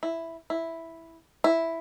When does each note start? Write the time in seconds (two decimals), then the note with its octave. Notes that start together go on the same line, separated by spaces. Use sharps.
0.03 E4
0.50 E4
1.44 E4